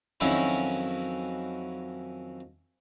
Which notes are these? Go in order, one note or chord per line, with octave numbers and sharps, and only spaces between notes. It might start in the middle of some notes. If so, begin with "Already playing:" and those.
F2 D#3 F#3 C#4 D#4 E4